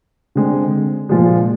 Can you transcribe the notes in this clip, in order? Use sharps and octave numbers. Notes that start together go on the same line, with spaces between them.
D3 G#3 C4
A#2 F3 G#3